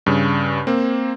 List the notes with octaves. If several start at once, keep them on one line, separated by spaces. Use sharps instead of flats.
G2 C#3
A#3 C4